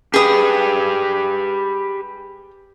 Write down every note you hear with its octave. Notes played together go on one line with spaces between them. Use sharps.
G4 G#4 B4 D#6